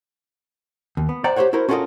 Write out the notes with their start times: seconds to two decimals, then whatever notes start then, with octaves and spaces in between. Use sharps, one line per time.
0.97 D#2
1.09 B3
1.24 C5 D5 F#5 G5 A#5
1.36 G4 A4 C5 C#5 F#5
1.53 E4 F#4 A#4 C5
1.69 C#4 F4 F#4 A4 A#4 D#5